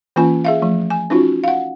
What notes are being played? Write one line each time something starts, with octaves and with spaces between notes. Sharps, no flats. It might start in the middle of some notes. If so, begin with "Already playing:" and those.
E3 A#3 C#4 F4 G#5
G#4 E5 F5
F3 A3
G#5
C#4 D#4 F4 F#4
F5 F#5